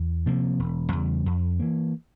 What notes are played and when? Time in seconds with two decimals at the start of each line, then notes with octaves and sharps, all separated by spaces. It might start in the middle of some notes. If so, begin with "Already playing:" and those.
Already playing: E2
0.26 C3 F3 A#3
0.59 E1
0.92 E2 C#3 G3
1.26 F2
1.60 E3 A#3